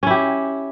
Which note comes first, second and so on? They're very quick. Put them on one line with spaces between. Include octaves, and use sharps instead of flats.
C#4 E4 G4